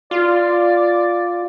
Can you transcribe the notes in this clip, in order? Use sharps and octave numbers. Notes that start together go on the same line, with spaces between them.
F4 D5